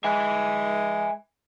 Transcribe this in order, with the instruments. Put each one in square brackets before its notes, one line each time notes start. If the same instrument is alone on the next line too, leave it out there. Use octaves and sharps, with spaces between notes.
[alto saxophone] G#3 [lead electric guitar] E5 G#5